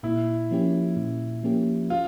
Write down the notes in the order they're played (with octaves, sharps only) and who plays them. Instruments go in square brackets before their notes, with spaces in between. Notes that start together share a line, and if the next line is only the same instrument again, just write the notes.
[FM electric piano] A#2 [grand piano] E4
[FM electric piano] F3 A#3 C#4 G4
A#2
F3 A#3 C#4 G4
[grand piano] F4